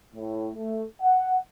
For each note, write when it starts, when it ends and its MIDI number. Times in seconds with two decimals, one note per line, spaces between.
0.15 0.48 45
0.54 0.83 57
1.02 1.37 78